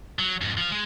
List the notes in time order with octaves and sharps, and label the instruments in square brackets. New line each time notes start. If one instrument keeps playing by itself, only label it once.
[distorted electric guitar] F#3
F2 G#2
F3 F5
G#3